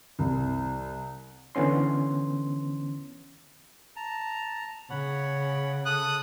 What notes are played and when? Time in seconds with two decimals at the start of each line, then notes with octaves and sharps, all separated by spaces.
0.19 C2
1.55 D3 E3 B3 C#4 C6
3.96 A5 A#5
4.90 C#3 C#5 F#5 B5
5.86 A4 D#6 F#6